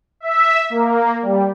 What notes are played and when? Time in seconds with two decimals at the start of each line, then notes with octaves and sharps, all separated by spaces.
0.20 E5
0.70 A#3
1.23 G3